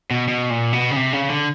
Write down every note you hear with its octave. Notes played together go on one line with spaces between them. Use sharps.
B2
B2
A#2
B2
C#3
C3
C#3
D3